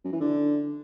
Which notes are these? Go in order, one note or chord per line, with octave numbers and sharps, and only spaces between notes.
F#2
E3
D3